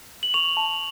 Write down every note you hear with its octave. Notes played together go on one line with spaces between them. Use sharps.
F#7
C#6 F7
A5